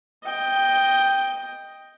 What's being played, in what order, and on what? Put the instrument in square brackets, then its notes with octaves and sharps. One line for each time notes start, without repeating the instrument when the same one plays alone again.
[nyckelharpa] D#5 G5